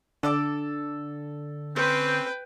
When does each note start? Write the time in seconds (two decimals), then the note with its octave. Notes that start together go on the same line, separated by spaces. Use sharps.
0.23 D3 A4 D5 D6
1.76 C4 C#4 B4 C5 G5